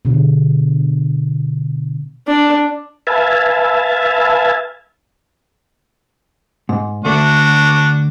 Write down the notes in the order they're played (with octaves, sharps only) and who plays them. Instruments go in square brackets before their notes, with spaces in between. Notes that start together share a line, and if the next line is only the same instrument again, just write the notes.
[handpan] B2 D3
[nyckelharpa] D4
[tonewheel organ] B4 E5 F5 G#5 A5
[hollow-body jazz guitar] G#2
[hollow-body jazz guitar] D2 A3 [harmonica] D4 F#4